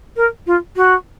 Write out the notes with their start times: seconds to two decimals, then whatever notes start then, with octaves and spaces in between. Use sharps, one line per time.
0.17 A#4
0.47 F4
0.76 F#4